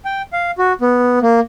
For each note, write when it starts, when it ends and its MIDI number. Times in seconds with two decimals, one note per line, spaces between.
0.05 0.22 79
0.33 0.51 77
0.58 0.73 66
0.81 1.19 59
1.22 1.40 58